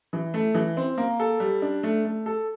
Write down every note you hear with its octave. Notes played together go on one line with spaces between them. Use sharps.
E3
A3
E3
C4
A#3
A4
G3
D4
A3
A3
A4